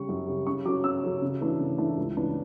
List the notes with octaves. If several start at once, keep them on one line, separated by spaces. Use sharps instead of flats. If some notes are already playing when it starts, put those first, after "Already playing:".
Already playing: C#3 G3 C#6
F#2
C#3 G3
C#3 C#6
F#3 C#4 D6
C#3 E6
F#3 C#4
C#3
E3 A3 D4
C#3
E3 A3 D4
C#2
C#3 E3 B3 D4